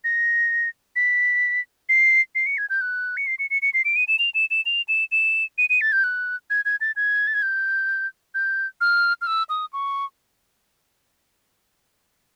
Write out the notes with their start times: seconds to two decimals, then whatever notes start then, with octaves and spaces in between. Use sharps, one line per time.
0.04 A#6
0.96 B6
1.89 C7
2.35 C7
2.46 C#7
2.58 G#6
2.70 G6
2.81 F#6
3.17 C#7
3.27 C7
3.39 C#7
3.50 C#7
3.62 C#7
3.74 C7
3.85 D7
3.96 D#7
4.08 E7
4.19 F7
4.35 E7
4.51 E7
4.66 F7
4.88 E7
5.12 E7
5.58 D#7
5.70 D#7
5.81 A6
5.92 G6
6.04 F#6
6.50 G#6
6.65 G#6
6.81 A6
6.96 G#6
7.27 A6
7.34 G#6
7.42 G6
8.34 G6
8.81 F6
9.21 F6
9.27 E6
9.49 D#6
9.73 C#6